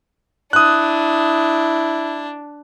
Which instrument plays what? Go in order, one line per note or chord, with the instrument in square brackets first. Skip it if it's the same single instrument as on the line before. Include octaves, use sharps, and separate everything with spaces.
[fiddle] D4 [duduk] E4 [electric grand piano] D#6 F#6